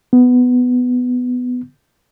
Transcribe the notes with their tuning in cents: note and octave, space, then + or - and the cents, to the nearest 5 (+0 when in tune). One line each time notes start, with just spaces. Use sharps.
B3 +10